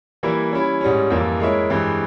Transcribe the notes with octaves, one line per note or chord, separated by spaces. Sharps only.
E3 G3 A#3 E4
G3 C#4 E4
G#2 G3 C#4
F2 E3 G3 A#3 F4
G#3 E4 A#4 C#5 E5
G2 E3 G#3 C4